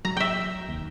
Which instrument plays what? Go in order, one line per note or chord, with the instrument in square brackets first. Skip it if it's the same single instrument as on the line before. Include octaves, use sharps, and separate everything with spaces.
[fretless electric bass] F#3 [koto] A#5
[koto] E5 G5
[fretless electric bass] F1 D#2